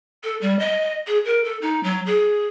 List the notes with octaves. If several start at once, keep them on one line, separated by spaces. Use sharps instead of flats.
A4
G3
D#5
G#4
A#4
A4
D#4
F#3
G#4